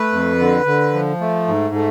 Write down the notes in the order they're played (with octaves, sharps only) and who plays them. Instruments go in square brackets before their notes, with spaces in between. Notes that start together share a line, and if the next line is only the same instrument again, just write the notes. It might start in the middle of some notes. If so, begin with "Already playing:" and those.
Already playing: [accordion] A3 B4
F2
D3
D3
F3
A3
G#2
A3